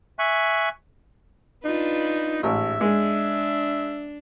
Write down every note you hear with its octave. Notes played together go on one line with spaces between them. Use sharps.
E5 G#5 C#6 F#6
D4 D#4 F4 B4
A1 G#2 E5
G#3 D4